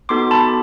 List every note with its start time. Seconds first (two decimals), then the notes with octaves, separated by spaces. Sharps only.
0.09 B3 D#4 F#4 A4 C6 D6
0.31 A5 B5